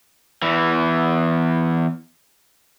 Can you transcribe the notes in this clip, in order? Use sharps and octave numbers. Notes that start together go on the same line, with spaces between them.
E2 E3